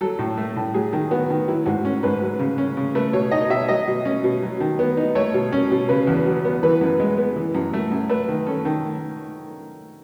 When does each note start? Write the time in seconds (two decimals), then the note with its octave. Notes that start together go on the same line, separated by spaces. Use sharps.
0.01 F#3 A4
0.19 A2
0.38 A3
0.56 A2
0.74 F#3 G#4
0.93 D#3
1.11 B3 F#4
1.30 D#3
1.48 F#3 E4
1.66 G#2 F#4
1.85 C#4
2.03 G#2 B4
2.22 F#3
2.39 C#3
2.58 C#4
2.77 C#3
2.95 A3 B4
3.13 B2 C#5
3.31 D#4 D#5
3.50 B2 E5
3.69 F#3 D#5
3.88 B2
4.05 C#4
4.24 B2
4.42 F#3
4.60 D#3
4.79 B3
4.97 D#4
5.15 A3 C#5
5.34 B2
5.52 C#4
5.71 B2
5.89 C#3 B4
6.07 E2
6.26 F#3
6.45 B3
6.63 E3 B4
6.81 F#2
7.00 G#3
7.18 B3
7.36 E3
7.55 F#2
7.73 A3
7.92 F#2
8.09 A3 B4
8.29 D#3
8.47 C#4 A4
8.65 D#3